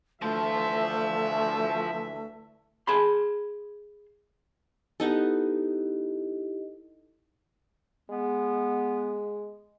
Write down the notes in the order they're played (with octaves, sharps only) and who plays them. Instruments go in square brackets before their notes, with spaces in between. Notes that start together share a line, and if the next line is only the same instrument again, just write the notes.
[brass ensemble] D2 E3 E5 [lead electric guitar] F3 C5 [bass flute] A3
[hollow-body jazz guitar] G#4 A5 B5 C6
[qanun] B3 D#4 A4 [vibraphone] E4 G4 D#5
[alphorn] G#3 [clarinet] B3